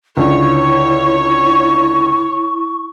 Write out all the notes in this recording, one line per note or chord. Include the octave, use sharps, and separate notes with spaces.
C#2 D3 E4 C#5 C#6